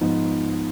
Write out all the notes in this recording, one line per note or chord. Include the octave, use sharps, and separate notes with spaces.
G#2 F3 B3 D#4